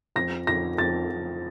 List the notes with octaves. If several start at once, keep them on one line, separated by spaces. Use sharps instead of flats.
F2 A#6
F2 A#6
F2 A6
F2